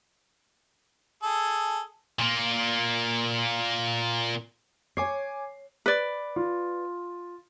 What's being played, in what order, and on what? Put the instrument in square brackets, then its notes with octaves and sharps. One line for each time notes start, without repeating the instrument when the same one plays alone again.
[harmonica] G#4 A4
[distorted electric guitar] A#2 A#3
[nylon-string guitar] C#5 [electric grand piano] G#5 D6 C7
[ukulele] B4 D5
[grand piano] F4